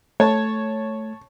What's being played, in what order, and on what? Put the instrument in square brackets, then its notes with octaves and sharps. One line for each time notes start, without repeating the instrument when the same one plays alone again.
[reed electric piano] A3 [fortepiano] C#5 A5